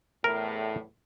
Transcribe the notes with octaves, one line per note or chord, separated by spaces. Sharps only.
E2 A2 A#4